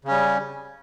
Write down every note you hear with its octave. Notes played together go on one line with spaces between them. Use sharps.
C#3 G3 C#4